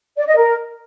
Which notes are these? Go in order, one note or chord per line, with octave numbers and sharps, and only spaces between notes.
D5
D#5
A#4